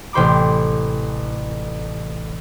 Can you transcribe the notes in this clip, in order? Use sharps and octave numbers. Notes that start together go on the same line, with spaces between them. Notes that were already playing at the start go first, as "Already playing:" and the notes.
A1 C3 C5 B5 D6